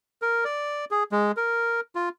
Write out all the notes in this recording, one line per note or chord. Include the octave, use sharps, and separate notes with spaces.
A#4
D5
G#4
G#3
A#4
F4